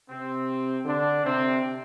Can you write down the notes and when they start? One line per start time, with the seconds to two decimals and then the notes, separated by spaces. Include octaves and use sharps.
0.10 C3 C4
0.85 D3 D4
1.24 C3 C4